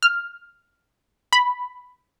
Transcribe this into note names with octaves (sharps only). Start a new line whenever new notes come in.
F6
B5